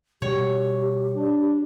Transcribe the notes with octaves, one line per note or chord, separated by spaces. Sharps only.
B2 G3 G4 C#5
D4